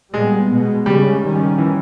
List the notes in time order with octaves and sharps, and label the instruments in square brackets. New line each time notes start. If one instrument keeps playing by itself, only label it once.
[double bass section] A#2 G3 B3 [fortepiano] G#3
[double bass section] B2 G#3 B3
[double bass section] C#3 G#3 C#4 [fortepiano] G3
[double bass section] D#3 G3 C#4
[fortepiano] E3